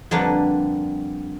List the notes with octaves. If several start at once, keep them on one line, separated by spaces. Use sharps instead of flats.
F2 D3 G3 A#3 D4 B4